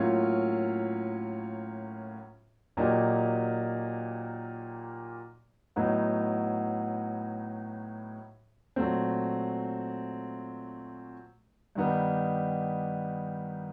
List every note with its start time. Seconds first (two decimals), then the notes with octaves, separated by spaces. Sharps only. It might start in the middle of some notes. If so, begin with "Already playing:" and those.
Already playing: A2 F#3 A#3 C#4 F4
2.77 A#2 F#3 A#3 D#4 G4
5.76 A2 F#3 B3 D#4
8.76 A#2 F#3 A3 C4
11.75 G2 D#3 G3 B3 D#4